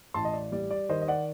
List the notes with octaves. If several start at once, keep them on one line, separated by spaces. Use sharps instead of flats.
A1 A5 C6
D#5
D5
G3 D5
D5
D#3 C5 D#5
D#5
D5 F#5